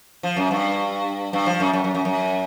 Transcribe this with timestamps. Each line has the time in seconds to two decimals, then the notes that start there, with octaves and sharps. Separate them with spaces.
0.23 F3
0.37 F#2
0.51 G2
1.33 G2
1.46 F3
1.60 F#2
1.73 F#2
1.84 F#2
1.95 F#2
2.05 F#2